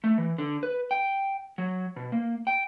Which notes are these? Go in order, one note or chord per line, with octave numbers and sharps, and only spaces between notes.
A3
E3
D3
B4
G5
F#3
B2
A#3
G5